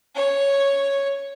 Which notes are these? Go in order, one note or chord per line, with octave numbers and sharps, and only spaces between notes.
C#5